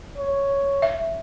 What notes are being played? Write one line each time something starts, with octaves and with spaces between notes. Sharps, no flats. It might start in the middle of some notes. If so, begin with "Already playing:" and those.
C#5
E5